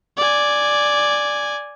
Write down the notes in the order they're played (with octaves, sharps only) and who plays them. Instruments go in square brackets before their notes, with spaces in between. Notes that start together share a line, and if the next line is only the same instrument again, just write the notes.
[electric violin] D5 G#5